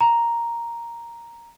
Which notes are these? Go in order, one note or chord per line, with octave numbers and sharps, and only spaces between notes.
A#5